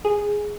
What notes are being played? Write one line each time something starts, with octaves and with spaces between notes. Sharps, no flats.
G#4